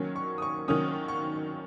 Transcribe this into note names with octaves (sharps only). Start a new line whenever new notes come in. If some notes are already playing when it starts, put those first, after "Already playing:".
Already playing: D#3 F#3 A#3 C#4
C#6
D#6
C#6
D#3 F#3 A#3 C#4 D#6
C#6